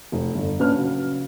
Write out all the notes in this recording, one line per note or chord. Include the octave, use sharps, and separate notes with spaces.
F1
G1
A#1 C#4 D4 B4 F6
C#3 F#3